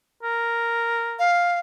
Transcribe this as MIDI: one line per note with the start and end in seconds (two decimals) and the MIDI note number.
0.23 1.23 70
1.19 1.59 77